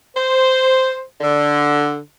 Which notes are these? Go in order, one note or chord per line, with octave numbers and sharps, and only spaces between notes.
C5
D3